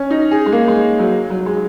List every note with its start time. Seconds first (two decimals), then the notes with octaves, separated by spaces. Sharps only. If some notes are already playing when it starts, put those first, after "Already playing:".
Already playing: C#4
0.10 D#4
0.31 G#4
0.46 G#3
0.52 A#3
0.68 G#3
0.99 F#3
1.30 F#3
1.46 G#3